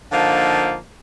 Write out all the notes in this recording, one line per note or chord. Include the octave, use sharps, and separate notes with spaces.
D3 F3 A#3 D#4